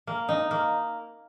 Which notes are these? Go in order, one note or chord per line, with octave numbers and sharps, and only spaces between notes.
A#3
D#4
A#3